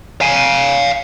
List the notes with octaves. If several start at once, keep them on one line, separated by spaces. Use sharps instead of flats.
F5 G#5